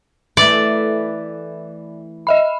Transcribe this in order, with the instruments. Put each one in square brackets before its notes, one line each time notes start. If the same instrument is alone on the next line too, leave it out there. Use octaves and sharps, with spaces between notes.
[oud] E3 A3 [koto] D5
[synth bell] D#5 E5 B5